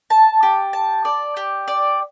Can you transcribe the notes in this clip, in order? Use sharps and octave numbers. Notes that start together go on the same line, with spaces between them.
A5
G4
A5
D5
G4
D5